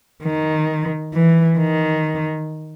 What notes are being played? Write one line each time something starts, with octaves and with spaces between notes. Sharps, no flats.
D#3
E3
D#3